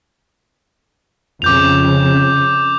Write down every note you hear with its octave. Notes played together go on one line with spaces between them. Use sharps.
F2 C#3 D6 G6 F7